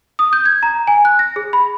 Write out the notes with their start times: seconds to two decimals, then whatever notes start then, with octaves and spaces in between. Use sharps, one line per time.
0.19 D#6
0.33 G6
0.45 G#6
0.63 A#5
0.87 G#5
1.05 F#6
1.19 A#6
1.36 G#4
1.53 B5